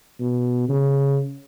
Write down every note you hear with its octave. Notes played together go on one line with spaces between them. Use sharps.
B2
C#3